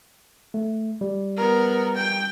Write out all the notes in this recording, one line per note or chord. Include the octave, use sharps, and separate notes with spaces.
A3
G3
B3 A#4
G5